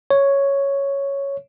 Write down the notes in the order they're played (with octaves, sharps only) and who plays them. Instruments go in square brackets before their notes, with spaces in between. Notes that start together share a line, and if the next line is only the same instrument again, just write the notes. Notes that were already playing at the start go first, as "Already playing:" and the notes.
[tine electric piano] C#5